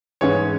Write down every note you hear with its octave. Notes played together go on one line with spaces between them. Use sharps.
G#2 E3 G#3 C#4 C#5